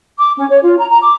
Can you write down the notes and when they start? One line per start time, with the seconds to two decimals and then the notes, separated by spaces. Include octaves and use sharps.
0.18 D6
0.36 C#4
0.50 C#5
0.63 F4
0.78 A#5
0.90 A#5
1.03 D6